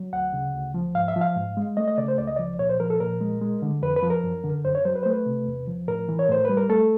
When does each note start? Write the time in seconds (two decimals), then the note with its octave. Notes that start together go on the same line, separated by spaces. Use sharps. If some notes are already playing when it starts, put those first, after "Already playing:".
Already playing: F#3
0.13 D2 F#5
0.33 C#3
0.54 D2
0.74 F3
0.95 G#2 F5
1.08 E5
1.16 F3
1.21 F5
1.36 G#2
1.57 G#3
1.77 A3 D#5
1.88 D#5
1.98 C#3 D5
2.08 C5
2.18 C#2 D5
2.27 D#5
2.36 F3 D5
2.59 A#2 C#5
2.69 C5
2.80 F3 A#4
2.90 A4
3.00 A#2 A#4
3.21 G#3
3.41 G#3
3.62 D3
3.82 F2 B4
3.96 B4
4.03 F3
4.10 A#4
4.24 F#2
4.44 D3
4.65 F#2 C5
4.75 C#5
4.85 F#3 C5
4.95 B4
5.03 C5
5.06 A3 B4
5.26 C3
5.47 E2
5.67 F3
5.88 A2 A#4
6.09 E3
6.19 C#5
6.29 A2 C5
6.45 G3 B4
6.57 A#4
6.69 A3 A4